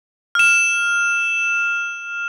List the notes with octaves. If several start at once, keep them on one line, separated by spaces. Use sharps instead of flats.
F6 E7